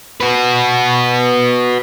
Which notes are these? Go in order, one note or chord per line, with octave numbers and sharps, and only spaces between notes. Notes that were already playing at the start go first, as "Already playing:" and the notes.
F#4 B4